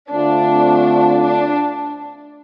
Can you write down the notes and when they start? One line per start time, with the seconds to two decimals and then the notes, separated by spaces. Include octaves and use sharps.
0.10 D3 A3 C4 D4 F4
1.21 D4